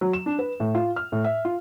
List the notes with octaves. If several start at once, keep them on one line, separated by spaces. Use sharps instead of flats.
F#3
E7
D4
B4
A2
F4
F6
A2
E5
F4